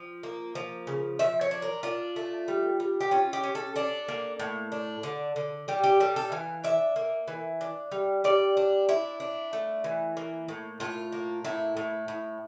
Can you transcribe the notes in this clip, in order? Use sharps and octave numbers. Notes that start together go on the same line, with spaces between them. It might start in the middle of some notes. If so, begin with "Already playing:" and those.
Already playing: F3
A#3
F3
C#3
F3 E5
C#5
D4
A#4
D4 F4
A3
G3
G3
G4
C#4 F4
G4
C#4
A4
D4 A4
A#3
A2
D4
D3
D3
G3 G4
G4
G3 A4
A4
E3 F5
D4 E5
A#3
E3
D4
G3
G3 D5
D4
D4 E4
D4
A3
E3
A#3
A2
A2 F4
A#3
A2 E4
A2
A2